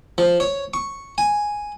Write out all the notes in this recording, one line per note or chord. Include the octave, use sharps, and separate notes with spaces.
F3
C#5
C#6
G#5